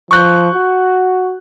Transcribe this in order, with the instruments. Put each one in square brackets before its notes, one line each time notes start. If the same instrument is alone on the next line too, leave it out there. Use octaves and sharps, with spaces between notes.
[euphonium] F3 [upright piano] C#6 F#6 G6
[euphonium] F#4